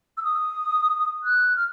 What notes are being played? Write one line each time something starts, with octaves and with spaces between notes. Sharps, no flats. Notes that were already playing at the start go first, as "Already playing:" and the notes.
E6
D#6
F#6
F6